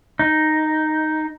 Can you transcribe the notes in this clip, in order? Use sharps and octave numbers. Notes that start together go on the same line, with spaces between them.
D#4